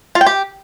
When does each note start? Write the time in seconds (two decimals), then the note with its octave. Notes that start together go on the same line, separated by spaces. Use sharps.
0.15 F4
0.21 G5
0.27 G4